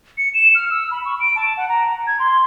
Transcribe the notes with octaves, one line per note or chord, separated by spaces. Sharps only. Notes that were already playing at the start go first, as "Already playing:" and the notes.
C#7
E7
F6
E6
B5
C#6
D7
A5
F#5
A#5
G#6
C6